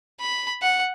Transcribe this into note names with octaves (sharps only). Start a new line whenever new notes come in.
B5
F#5